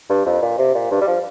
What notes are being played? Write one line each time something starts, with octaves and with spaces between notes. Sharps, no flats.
G2
F2
A#2
C3
A#2
G2
G3
F3